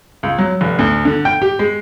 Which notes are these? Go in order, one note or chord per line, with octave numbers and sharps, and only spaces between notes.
C#2
F#3
F1
D2
D3
G5
G4
G#3